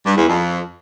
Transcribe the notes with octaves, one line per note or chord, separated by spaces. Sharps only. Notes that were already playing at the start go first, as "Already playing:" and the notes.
G2
E2
F2